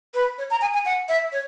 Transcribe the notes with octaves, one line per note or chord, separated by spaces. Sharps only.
B4
C#5
A#5
G#5
G#5
F#5
E5
C#5